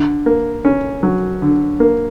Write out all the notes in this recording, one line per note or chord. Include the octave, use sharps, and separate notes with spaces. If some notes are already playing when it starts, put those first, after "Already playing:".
Already playing: D3
A#3
C#4
F#3
D3
A#3